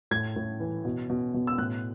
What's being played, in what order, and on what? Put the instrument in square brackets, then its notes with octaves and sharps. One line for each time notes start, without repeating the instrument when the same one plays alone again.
[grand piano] A2 G#6
A2
E3
B2
B2
B2
E6
A2 F#6